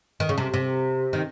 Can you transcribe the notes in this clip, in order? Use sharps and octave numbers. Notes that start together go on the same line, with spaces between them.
D#3
C#3
C3
C3
D#3